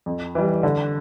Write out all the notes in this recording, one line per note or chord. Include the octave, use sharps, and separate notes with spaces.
F2
E3 G3
D3